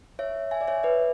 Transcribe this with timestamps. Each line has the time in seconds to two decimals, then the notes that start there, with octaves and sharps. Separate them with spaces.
0.19 C#5 E5
0.51 E5 G#5
0.61 D5
0.68 C#5 E5
0.83 B4 D5